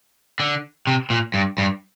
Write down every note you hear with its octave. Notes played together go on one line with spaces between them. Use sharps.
D3
C3
A#2
G2
G2